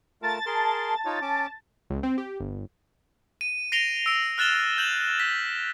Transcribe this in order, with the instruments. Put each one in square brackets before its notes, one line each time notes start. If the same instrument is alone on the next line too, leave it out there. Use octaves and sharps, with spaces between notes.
[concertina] A3 F4 A#4 [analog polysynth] A5 A6
[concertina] G#4 A#4 C6
D#4 F4 C#5
C#4 D6
[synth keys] C#2
C4
G4
G1
[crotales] D#7
A#6 C7 D7 D#7 F7 G7
E6 D7
F6 F#6 A6 E7 G7
G6 E7 F#7
B6